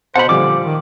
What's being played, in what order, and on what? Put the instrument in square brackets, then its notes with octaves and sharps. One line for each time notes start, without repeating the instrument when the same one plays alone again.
[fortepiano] B2 A5 [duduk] C5 [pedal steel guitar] F#5 B5
[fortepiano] A#2 F3 G3 [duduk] D3 [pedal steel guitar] D6
[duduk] D#3